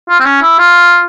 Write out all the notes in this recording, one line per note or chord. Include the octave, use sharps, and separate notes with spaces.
F4
C4
C#4
E4
F4